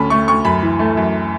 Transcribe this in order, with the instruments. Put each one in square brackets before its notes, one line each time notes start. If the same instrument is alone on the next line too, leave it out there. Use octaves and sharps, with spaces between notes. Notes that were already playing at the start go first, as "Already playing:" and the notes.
Already playing: [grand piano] D2 D3 C#4 A5 B5
A3 C#6
D2 C#6
F#2 B5
E3
A3
F#2